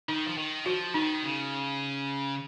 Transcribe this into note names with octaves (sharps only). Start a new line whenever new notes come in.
D#3 D#4
F3
D#3
F3 F#4
D#3 D#4
C#3